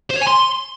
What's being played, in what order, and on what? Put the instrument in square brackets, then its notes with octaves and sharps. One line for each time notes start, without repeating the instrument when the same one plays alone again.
[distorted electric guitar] C5
C#5
G#5
C6